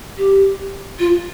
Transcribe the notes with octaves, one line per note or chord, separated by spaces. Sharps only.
G4
F4